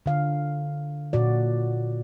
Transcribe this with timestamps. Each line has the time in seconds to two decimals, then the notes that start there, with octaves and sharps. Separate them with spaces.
0.06 D3 F5
1.13 A#2 F#4 D5